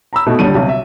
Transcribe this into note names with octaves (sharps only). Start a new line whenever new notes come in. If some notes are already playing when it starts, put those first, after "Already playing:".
A#5 B5 E6
B2 A3 D#4
D#1 D3 G3 A5 D#7
B1 C3
E5